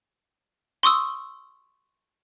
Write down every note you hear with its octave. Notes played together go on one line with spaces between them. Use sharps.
C6 C#6 D#6 E6